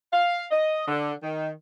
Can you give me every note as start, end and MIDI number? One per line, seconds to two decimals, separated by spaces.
0.13 0.44 77
0.51 0.85 75
0.88 1.13 50
1.23 1.50 51